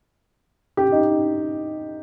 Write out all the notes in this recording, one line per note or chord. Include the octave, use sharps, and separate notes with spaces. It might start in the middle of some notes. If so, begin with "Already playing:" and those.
G4
D#4